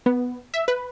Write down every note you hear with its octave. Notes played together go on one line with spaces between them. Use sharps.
B3
E5
B4